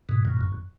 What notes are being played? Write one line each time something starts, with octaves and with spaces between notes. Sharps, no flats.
G#2 B2
F#2 A#2
F#2